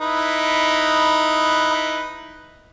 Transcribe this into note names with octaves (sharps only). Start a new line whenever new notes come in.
D#4 E4 B4